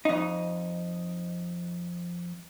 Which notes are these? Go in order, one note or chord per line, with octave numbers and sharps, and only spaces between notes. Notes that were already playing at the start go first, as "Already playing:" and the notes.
F2 D#4